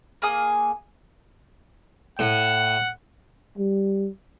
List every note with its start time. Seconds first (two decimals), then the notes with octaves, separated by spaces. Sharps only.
0.22 A#3 G#4 G#5 D#6
2.19 A2 F#5
3.58 G3